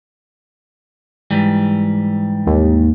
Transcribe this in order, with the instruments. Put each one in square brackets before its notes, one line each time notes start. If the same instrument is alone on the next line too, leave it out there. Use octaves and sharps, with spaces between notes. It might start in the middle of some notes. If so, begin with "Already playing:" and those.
[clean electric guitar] G#2 E3 G3
[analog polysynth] D#2